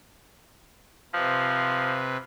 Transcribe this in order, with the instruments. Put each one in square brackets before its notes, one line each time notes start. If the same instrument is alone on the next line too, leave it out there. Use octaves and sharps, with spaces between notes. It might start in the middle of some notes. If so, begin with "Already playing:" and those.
[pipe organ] C3 B4 [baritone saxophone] F3